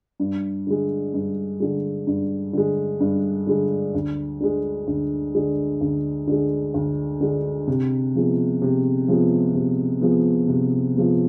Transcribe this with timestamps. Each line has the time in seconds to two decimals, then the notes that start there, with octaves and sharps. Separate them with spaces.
0.20 G2
0.67 D3 G#3
1.14 G2
1.60 D3 G#3
2.07 G2
2.53 D3 G#3
3.00 G2
3.47 D3 G#3
3.94 D2
4.40 D3 G#3
4.87 D2
5.35 D3 G#3
5.81 D2
6.27 D3 G#3
6.74 D2
7.21 D3 G#3
7.67 C3
8.15 F3 G#3 B3
8.62 C3
9.08 F3 G#3 B3
9.55 C3
10.01 F3 G#3 B3
10.48 C3
10.95 F3 G#3 B3